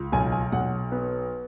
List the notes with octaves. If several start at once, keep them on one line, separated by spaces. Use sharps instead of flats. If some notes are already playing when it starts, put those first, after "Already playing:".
Already playing: C#2
B1 G#5
G#5
B1 F#5
B3